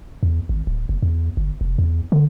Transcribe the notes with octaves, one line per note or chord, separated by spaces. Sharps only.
E2
G#1
D1
F#1
E2
G1
F1
E2
D3